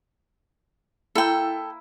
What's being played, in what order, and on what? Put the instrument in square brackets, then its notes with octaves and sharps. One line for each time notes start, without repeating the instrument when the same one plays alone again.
[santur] A#3 E4 [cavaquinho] A4 G5